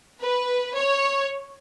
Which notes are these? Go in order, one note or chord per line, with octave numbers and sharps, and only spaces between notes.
B4
C#5